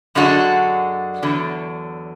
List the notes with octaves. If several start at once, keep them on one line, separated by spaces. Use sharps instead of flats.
F#2 D3 G#3 D4 F#4
E2 D3 F#3